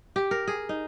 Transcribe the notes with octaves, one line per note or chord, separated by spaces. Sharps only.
G4
A#4
G#4
D#4